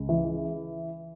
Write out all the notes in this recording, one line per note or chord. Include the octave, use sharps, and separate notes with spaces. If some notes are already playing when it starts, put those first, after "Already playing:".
Already playing: C#2
E3